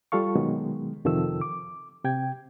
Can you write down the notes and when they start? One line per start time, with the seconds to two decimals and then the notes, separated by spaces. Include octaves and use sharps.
0.12 G3 F4 A4 F5 C#6
0.35 B2 D#3 F#3 G#3 B3
1.05 F2 C3 D#3 F3 A4 E6
1.41 D6
2.04 C3 G5 G#6